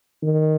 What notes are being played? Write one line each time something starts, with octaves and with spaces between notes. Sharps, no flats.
D#3